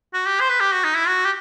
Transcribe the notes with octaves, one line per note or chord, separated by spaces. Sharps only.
F#4
G4
C5
B4
G4
F#4
D#4
E4
F#4
G4